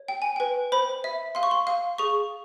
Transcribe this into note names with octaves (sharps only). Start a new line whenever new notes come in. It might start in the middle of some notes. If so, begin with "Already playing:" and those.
Already playing: C#5
G5
G#5
B4 G5
C5 B5
E5
F5 C6
C#6
C6
F5
G#4 C#6